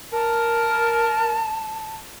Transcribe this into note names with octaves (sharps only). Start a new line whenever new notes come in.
A#4 A5